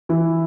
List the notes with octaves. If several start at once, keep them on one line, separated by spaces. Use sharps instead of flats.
E3 E4